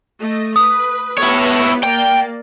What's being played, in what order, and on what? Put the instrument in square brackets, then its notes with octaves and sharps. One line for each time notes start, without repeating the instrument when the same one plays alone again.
[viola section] A3 D#5
[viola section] B4 [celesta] D#6
[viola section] B3 G4 B4 [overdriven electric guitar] E4 C#5
[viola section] A#3 D5 [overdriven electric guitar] G5